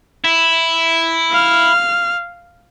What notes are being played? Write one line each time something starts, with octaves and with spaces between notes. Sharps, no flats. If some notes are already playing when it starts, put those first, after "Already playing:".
E4
F5 F6